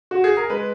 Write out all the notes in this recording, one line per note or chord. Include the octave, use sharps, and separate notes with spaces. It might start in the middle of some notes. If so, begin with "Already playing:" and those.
F#4
G#4
A#4
G#3 B4